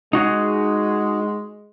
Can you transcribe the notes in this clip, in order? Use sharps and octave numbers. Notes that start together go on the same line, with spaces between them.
G#3 D#4 F#4 G#4